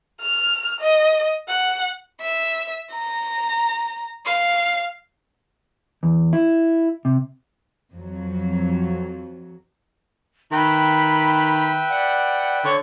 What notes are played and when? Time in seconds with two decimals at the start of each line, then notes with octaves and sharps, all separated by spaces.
0.21 F6
0.81 D#5
1.48 F#5
2.21 E5
2.92 A#5
4.26 F5
6.03 E2
6.33 E4
7.05 C3
7.95 F2 F#3
10.52 D#3 B4 E5 G5 B5
11.90 D5 F#5
12.65 D3 C#5 C#6